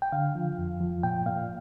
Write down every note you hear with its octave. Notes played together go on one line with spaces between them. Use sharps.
G5
D3 F5
F3
F2
F3
A#2 G5
A#2 F5